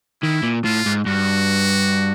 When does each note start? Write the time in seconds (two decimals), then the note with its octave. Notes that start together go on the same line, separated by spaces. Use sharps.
0.22 D#3 E4
0.43 A#2
0.64 A2 F4
0.86 G#2
1.06 G2 F#4